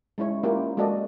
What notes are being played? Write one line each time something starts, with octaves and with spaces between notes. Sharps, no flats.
G#3 C#4 E4 C#5
A#3 C#4 E4 F4 G4 A#4
G#3 A#3 F#4 A4 D5 D#5